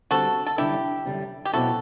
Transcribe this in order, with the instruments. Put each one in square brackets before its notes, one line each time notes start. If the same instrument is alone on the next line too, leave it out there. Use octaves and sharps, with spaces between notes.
[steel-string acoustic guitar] D3 G3 C4 [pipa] F#4 A4
[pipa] A4
[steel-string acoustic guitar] F#2 D3 G3 D4 [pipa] E4 G4
[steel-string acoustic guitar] F#2 D3 G3 D4
[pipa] G4
[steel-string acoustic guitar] B2 F#3 C4 E4 [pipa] F#4 A4